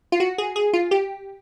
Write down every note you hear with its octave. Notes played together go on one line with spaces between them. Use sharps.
F4
F#4
G#4
G#4
F4
G4